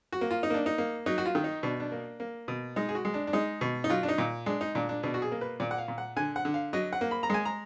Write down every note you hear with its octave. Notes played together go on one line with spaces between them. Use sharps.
F#4
A#3
F4
D#4
A#3 D4
D#4
A#3
F#3 D#4
F#4
F4
D#3
D#4
B2 D4
D4
A#3
A#3
B2
G#3 D#4
G#4
F#4
G#3
D4
D4
G#3 D#4
B2
D#4
F#3 F4
D4
D#4
A#2
G#3 D4
D#4
A#2 D4
D4
B2 D4
F#4
G#4
A#3
B4
A#2 D5
F#5
F5
A#2
F#5
D3 G#5
F#5
D3
F5
F#3 D#5
F#5
A#3
B5
A#5
G#3 G#5
A#5